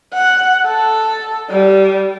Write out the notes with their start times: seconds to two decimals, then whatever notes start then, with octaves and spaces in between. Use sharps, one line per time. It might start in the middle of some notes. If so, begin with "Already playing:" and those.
0.14 F#5
0.67 A4
1.50 G3